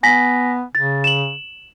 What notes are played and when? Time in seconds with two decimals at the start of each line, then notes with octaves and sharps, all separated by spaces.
0.03 B3 G#5 A#6 B6
0.75 C#3 A6
1.04 E7 F#7